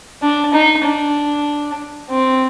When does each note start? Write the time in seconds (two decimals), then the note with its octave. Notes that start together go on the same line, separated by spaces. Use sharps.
0.22 D4
0.54 D#4
0.85 D4
2.10 C4